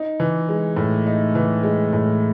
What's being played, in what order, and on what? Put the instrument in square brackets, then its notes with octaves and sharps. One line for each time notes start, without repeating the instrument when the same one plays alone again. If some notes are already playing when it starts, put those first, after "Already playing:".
Already playing: [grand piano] D#4
E3
G#3
A2
D#4
E3
G#3
A2